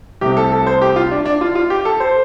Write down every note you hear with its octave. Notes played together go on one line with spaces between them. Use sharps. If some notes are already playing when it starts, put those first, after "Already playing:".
C2 C3 A3 G4
A4
A4
C5
G4
F4
D4
D4
F4
F4
G4
A4
C5